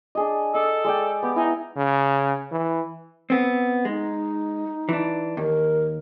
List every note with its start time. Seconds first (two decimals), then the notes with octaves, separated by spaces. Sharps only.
0.15 D4 G#4 D#5
0.54 A4 D#5 D6
0.84 G#3 D5 G5
1.23 B3 G4
1.36 D#4 E4 G#5
1.76 C#3
2.52 E3
3.30 B3 C4
3.85 G#3 D#4
4.89 E3 D4
5.37 D#2 A#4